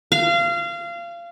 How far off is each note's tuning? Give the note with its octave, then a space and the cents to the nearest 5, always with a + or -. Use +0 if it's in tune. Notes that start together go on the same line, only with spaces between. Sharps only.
F5 -25